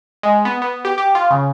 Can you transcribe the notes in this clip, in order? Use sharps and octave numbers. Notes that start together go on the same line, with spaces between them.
G#3
B3
B3
G4
G4
F4
C#3